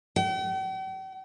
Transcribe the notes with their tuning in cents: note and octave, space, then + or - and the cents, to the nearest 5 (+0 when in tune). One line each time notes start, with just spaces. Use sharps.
G5 -45